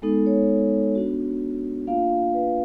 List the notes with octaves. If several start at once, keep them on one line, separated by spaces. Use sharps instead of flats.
G#3 B3 D#4 A4
C#5
B3 D4 F#4
A#3 D4 F4 F5
F5
B4